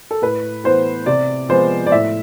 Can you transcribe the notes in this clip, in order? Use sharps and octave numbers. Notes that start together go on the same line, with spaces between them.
A4
A2 B4
E3 B3 C5
C3 D5
F3 G#3 B3 C5
D5
A2 E5